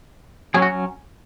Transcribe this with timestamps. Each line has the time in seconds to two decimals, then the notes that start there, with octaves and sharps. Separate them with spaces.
0.54 F#3 C#4 G#4
0.62 F#4